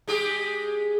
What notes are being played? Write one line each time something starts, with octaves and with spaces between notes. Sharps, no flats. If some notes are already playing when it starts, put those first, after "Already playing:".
G#3 G4 G#4